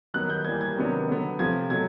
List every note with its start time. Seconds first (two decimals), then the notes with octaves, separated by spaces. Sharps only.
0.14 D#3 F#3 B3 F#6
0.30 G6
0.44 E3 G3 A#3 G#6
0.61 G#6
0.76 C3 D#3 F#3 B3 D4
1.08 D3 F#3 B3
1.39 C3 F3 A3 G#6
1.70 B2 F#3 A3 G#6